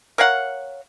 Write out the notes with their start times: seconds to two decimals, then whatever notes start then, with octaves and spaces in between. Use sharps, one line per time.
0.18 A#4 C#5 F5 F#5